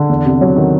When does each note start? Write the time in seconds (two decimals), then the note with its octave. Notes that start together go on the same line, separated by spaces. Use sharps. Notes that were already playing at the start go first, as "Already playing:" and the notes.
Already playing: D3
0.09 E2
0.26 C3
0.41 F#3
0.56 D#3